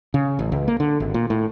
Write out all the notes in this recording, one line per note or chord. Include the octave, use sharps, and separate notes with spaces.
C#3
A1
C#2
A#3
D3
G#1
A#2
A2